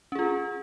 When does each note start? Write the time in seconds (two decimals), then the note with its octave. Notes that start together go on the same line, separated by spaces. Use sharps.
0.12 C#4
0.15 G#4
0.19 F4